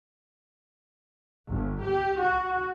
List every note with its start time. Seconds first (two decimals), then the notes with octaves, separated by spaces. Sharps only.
1.50 G1
1.83 G4
2.20 F#4